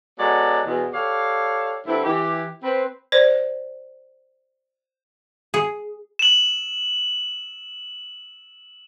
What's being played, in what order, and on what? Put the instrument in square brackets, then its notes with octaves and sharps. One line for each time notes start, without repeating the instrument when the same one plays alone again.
[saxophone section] F#3 G#3 B3 F#4 A4 D5
E2 B2
G4 A4 C#5 D5 F5
G2 D3 C4 E4
E3 G4
C4 B4
[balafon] C5 D5
[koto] G#4
[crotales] E7 F#7